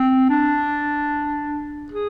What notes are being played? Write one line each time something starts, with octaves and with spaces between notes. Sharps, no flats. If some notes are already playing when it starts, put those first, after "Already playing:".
Already playing: C4
D4
G#4